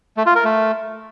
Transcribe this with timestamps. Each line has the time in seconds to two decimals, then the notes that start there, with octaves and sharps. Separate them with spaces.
0.17 A3
0.26 F4
0.35 A#4
0.45 A3